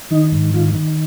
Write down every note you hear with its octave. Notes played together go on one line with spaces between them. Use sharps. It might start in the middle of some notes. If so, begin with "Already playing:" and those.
D#3 D#4
G#2
D#3 F4
D#3